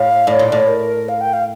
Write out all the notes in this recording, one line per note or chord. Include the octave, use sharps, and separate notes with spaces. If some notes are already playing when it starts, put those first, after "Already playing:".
Already playing: A2 F5
A2 D5
A#2
A2
A#4
F5
G5
F5